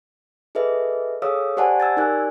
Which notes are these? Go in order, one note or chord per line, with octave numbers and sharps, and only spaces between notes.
G#4 A4 B4 D#5 E5
G#4 A4 C#5 F5 D#6 E6
G4 C5 D5 F#5 G#5 A5
E6 G#6 A6
D#4 G4 A#4 D5 G#5 F#6